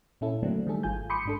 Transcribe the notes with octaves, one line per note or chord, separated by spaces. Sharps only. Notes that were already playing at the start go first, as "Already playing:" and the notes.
A#2 C#4 E4 A4
D3 F#3 A3 A#3 C4 D4
D#3 G3 A3 G#4 A4
G#1 F4 G#5 G6
B5 C6 D6 D#6 G6 C#7
G#2 D4 A4